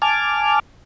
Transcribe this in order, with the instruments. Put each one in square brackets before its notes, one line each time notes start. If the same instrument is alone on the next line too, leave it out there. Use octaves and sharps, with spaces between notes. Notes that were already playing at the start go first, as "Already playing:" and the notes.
[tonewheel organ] G#5 A5 D6 F6